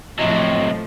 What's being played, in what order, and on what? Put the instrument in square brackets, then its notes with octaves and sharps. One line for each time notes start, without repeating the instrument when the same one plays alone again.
[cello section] A2 F3 [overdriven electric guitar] C3 F#3 [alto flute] D#5